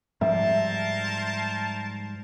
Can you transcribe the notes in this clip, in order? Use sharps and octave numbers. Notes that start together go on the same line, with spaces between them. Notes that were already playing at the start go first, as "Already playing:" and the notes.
G#2 F3 G3 A#4 C5 E5 A5